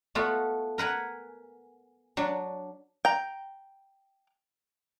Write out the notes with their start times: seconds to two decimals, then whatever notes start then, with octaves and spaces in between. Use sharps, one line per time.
0.15 A3 B3 F4 F#4
0.78 A#4 B4 F#5 G#5
2.17 F#3 D4
3.05 G5 A#5